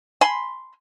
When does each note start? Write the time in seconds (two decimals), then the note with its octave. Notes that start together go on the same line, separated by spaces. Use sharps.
0.21 G#5 B5 C6